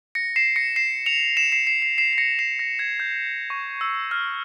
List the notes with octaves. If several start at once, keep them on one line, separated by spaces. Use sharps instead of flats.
A#6 C#7
C7 E7
A#6 C#7
C7 E7
C#7 F7
C7 E7
C7 E7
C7 E7
C7
C7 E7
C7
A#6 C#7
C7 E7
A#6
G#6
G6
C#6
E6
F6